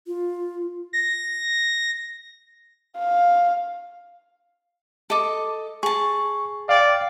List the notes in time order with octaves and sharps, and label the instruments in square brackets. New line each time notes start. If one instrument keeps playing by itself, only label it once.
[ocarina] F4
[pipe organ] A#6
[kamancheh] F5
[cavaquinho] A4 D#5 D6
[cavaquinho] G#4 A5 [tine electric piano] C#6
[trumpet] D5 [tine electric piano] F5 G5